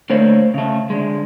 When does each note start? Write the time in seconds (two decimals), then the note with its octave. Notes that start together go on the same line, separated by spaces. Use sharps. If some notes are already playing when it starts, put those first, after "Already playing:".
0.10 D3 A3 A#3 C5 C#5
0.54 C#3 A3
0.90 D3 G#3